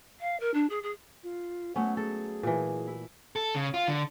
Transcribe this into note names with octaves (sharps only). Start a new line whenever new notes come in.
F5
A#4
D4
G#4
G#4
F4
F#3 A3 B3 C#4 F#5
G#4 A4
A#2 E3
E4
A4
C#3
F4
D3